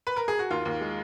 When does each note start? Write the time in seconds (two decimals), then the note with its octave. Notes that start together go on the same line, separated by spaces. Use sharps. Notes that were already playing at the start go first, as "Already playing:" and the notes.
0.07 B4
0.16 A#4
0.28 G#4
0.39 F#4
0.51 D#2 F4
0.65 D#2
0.81 G#3